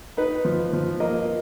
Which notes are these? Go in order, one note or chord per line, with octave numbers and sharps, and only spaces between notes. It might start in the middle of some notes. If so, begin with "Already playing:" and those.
D#4 B4
F3
F3
A#3 D#5